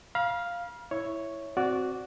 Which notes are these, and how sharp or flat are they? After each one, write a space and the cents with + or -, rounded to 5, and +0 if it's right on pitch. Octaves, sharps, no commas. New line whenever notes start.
F5 +0 B5 -45
E4 +0 C#5 +0
C4 +0 F#4 +0 D5 -15